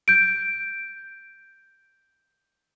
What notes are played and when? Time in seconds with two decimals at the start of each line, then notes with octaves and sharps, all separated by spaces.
0.08 G6 D7